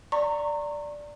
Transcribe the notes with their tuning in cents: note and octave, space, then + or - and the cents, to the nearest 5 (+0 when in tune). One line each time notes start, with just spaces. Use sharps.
D5 +0 A#5 -25 C#6 -30